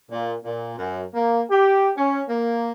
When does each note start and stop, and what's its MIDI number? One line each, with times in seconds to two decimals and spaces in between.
0.11 0.33 46
0.45 0.74 46
0.79 1.03 42
1.15 1.42 58
1.51 1.91 67
1.97 2.22 61
2.29 2.72 58